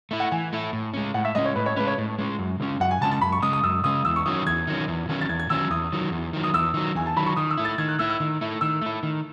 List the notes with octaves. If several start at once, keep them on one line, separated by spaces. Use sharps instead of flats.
A3 E4
F#5
E3 G#5
A3 E4
A2
G#3 C#4
A2 F#5
E5
G#3 C#4 D#5
C#5
A2 B4
C#5
G#3 C#4 B4
C#5
A2
G#3 C#4
F#2
C#3 G#3 C#4
F#2 F#5
G#5
C#3 G#3 C#4 A5
A5
F#2 B5
C#6
C#3 G#3 C#4 D#6
D#6
F#2 E6
C#3 G#3 C#4 D#6
E2 E6
C#6
D#3 F#3 C#4 D#6
E2 G#6
D#3 F#3 C#4
E2
D#3 F#3 C#4
A6
E2 G#6
G#6
D#3 F#3 C#4 E6
E2 D#6
D#3 F#3
E2
D#3 F#3
D#6
E2 E6
D#3 F#3
E2 G#5
A5
D#3 F#3 B5
C#6
D#3 D#6
E6
A3 E4
A6
D#3 G#6
F#6
A3 E4 E6
E6
D#3
A3 E4
D#3 E6
A3 E4
D#3